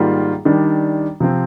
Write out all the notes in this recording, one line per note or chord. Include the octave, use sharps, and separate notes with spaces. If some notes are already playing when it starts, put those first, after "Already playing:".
Already playing: G#2 D#3 G3 A#3 F4
D#3 G3 D4
C3 F3 C4